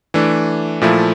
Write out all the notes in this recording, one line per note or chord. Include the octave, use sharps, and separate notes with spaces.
E3 A3 D4
A#2 F3 A3 E4